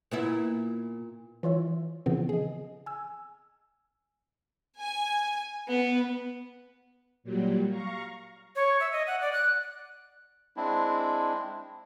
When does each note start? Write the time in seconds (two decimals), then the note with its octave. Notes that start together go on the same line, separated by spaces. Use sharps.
0.11 A#2 B3 E4
1.43 E3 F4 C#5 E5
2.06 A#2 C#3 E3 F3 B3 C4
2.29 G#4 D#5
2.86 G#5 E6
4.78 G#5
5.69 B3
7.24 A#2 F#3 G3
7.70 F5 A#5 C#6
8.56 C#5
8.80 E5
8.92 D#5
9.07 F#5
9.21 D5
9.33 F#6
10.57 G#3 C4 D4 E4